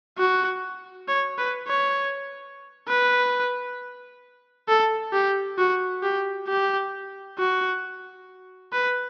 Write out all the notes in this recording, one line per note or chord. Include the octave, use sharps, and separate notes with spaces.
F#4
C#5
B4
C#5
B4
A4
G4
F#4
G4
G4
F#4
B4